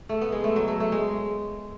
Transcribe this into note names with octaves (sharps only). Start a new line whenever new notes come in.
A3
B3
G#3
A3
F#3
A3
A3
G#3